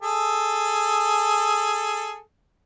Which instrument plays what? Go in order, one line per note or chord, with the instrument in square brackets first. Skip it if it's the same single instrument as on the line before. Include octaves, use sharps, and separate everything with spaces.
[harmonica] G#4 A4